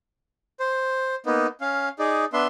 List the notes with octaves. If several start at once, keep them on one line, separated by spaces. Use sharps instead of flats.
C5
A#3 B3 D#4
C#4 F5
D#4 G#4 D5
B3 D4 E5 C6